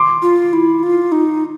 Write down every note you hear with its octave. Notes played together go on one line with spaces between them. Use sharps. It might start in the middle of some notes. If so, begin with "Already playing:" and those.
Already playing: C6 D6
F4
E4
F4
D#4